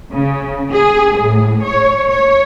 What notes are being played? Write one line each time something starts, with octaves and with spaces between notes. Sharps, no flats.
C#3
G#4
A2
C#5
C#5